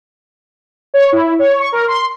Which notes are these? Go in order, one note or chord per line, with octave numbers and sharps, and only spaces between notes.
C#5
E4
C#5
C#6
A#4
C6